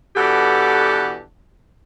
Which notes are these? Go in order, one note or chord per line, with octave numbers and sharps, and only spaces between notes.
B2 E3 D4 F#4 G4 A4